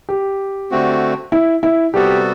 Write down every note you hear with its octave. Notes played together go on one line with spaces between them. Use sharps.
G4
D3 A3 C4 F#4
E4
E4
C3 G3 B3 F#4 G4 A4